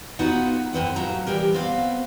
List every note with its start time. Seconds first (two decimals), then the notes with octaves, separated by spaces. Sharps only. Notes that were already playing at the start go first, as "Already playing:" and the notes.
0.19 B3 D#4 F4 F#4 F#5
0.73 F#2 C4 B4 F#5
0.96 A2 F3 F#3 A#5
1.26 E3 G3 G4 A#4
1.53 B3 C4 F5